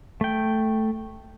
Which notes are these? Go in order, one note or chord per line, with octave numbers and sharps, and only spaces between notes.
A3 G5